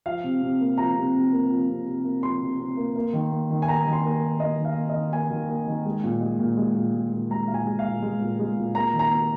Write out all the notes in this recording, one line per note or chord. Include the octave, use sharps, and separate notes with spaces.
F3 F5
C3
C3
A#3
F3 A#5
C3
C3
A#3
F3
C3
C3
A#3
F3 C6
C3
C3
A#3
A#3
D#3
A#3
D#3
G#5
A#3 A#5
D#3
C6
A#3
D#3
A#3 D#5
D#3
F5
A#3
D#5
D#3
A#3 G#5
D#3
A#3
D#3
G#3
A#2
G#3
A#2
G#3
A#2
G#3
A#2
G#3 A#5
A#2 F5
G#5
G#3
F5
A#2
G#3
A#2
G#3
A#2
A#3 A#5
D#3
A#5
A#3